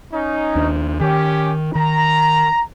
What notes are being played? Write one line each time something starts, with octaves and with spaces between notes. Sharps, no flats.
C#4 D#4
D#2 D4
D#3 C#4 G4
D#3 A#5